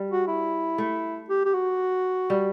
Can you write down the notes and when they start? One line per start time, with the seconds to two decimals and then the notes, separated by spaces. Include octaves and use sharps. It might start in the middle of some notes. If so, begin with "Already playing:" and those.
Already playing: G3
0.10 F#4
0.27 E4
0.78 A3
1.29 G4
1.45 G4
1.53 F#4
2.30 G3